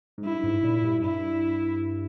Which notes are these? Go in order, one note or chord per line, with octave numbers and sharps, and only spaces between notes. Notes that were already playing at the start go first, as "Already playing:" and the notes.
G#2
G2 E4
G#2
A#2
G2
G2 E4